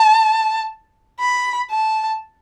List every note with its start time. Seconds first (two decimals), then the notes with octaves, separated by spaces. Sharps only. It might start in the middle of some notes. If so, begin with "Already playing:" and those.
Already playing: A5
1.20 B5
1.71 A5